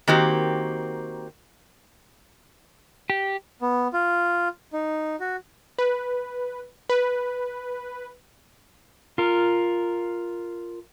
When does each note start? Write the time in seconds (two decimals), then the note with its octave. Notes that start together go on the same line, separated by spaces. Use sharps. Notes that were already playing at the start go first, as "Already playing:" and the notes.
0.08 D#3 A#3 C4 F#4 G4
3.10 G4
3.61 B3
3.93 F4
4.73 D#4
5.20 F#4
5.78 B4
6.90 B4
9.18 F4 A#4